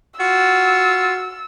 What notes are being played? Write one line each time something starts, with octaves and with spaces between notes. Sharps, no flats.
F4 F#4 E6